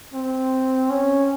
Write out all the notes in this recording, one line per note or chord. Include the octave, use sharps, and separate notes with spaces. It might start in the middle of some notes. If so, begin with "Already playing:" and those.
C4
C#4